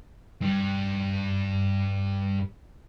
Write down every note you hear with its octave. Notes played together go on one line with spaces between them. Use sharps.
G2 G3